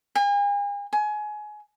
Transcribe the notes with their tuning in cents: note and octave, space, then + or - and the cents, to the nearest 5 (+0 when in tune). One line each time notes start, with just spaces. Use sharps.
G#5 -40
G#5 +25